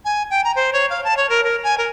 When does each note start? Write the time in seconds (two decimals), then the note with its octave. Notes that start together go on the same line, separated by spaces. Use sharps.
0.05 G#5
0.30 G5
0.44 A#5
0.56 C5
0.73 C#5
0.90 F5
1.04 A5
1.17 C#5
1.29 A#4
1.44 A#4
1.64 G#5
1.78 A#4